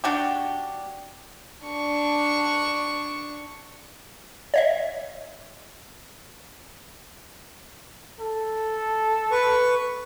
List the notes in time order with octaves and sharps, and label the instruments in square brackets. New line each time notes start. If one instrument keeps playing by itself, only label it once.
[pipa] D4 F#4 G4
[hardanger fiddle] D4 C#6
[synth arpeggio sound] C#5 D#5 E5
[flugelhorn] A4
[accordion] B4 C#6